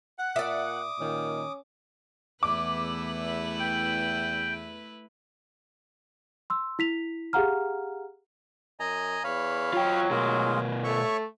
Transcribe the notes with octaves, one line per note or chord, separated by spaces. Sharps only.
F#5
A#2 D5 E5 D6 D#6
A#2 D#3 C#4
E2 A3 E4 B4 D6
G5
C6 E6
E4 B6 F7
G4 G#4 F5 F#5 A#5 F6
F#2 D#5 G#5 A#5
E2 C#5 F5 B5
F#3 F4 G5
B2 G#3 F4 A#4
A3 C#5 E5 C#6